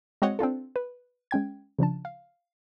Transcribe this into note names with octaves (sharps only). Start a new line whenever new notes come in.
G#3 C4 F#4 C#5 D#5 F#5
C4 D4 F4 A4
B4
G#3 C#4 G5 G#6
C#3 F3 D4 A5
F5